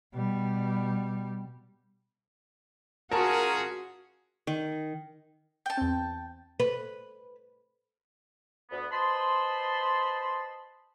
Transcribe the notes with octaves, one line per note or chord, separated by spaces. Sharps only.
B2 G3
C#4 F4 F#4 G#4 A#4 A5
D#3
G5 A5
E2 C4
B4
D2 B3
B4 C5 D#5 A5 B5 C6